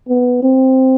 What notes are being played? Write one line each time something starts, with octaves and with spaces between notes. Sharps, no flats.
B3
C4